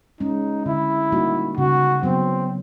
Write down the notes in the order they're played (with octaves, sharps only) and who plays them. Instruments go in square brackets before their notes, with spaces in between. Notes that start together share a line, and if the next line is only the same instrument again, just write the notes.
[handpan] G#3 C#4 [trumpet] D#4
[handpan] D3 [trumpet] E4
[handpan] G3 A#3 D#4 F#4
[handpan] C#3 [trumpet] F#4
[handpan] F#3 B3 [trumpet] C4